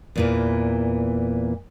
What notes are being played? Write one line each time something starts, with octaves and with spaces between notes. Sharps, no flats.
E2 A#2 E3